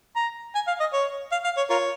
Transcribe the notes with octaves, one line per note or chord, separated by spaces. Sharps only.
A#5
G#5
F5
D#5
C#5
F5
F5
C#5
F4 A#4 C#5